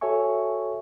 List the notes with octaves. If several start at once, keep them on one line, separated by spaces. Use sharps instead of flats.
F#4 A4 C#5 E5 G#5 C#6